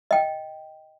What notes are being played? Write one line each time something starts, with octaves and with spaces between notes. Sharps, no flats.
D#5 G5